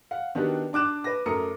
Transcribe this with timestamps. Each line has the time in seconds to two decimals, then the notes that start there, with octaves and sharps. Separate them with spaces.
0.11 F5 F#5
0.35 D#3 B3 D4 F#4 G4
0.73 D4 D6 F#6 E7
1.04 B4 A#6
1.26 F#2 A3 A#4 A#5 D#6 C#7